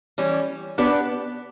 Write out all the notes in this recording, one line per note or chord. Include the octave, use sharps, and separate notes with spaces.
E3 G3 C#4
B3 D4 G4 B4 D5